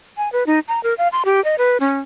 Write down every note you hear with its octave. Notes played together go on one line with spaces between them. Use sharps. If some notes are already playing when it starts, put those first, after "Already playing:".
G#5
B4
D#4
A#5
A#4
F5
C6
G4
D#5
B4
C#4